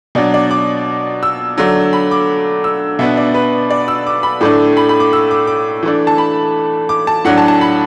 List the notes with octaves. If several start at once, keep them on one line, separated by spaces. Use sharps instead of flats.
B2 F#3 D4 D5
D5
D6
E6
D3 F#3 A3 D4
B5
D6
E6
B2 B3 D4 E5
D5
B4
D5
E6
D6
B5
A2 A3 D4 D6
B5
B5
D6
E6
D6
D6
E3 A3 D4
A5
B5
D6
A5
A2 F#3 D4 F#5
A5
A5
B5